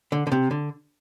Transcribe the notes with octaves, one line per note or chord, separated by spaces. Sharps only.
D3
D3
C3
D3